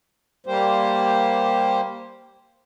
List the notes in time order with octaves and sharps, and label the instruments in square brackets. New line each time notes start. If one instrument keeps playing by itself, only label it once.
[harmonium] G3 A#3 G4 C5